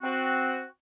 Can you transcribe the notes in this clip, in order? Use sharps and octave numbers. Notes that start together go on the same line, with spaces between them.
C4 F#4